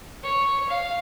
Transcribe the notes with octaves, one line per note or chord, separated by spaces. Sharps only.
C#5
F5